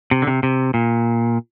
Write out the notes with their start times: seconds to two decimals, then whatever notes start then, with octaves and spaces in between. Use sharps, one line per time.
0.11 C3
0.22 D3
0.27 C3
0.43 C3
0.74 A#2